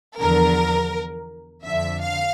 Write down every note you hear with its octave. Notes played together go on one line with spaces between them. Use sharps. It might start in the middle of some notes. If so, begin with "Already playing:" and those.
E2 D3 F3 A#4
F2 D3 F3 E5
F5